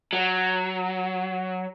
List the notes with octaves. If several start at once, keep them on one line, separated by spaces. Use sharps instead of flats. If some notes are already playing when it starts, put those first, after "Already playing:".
F#3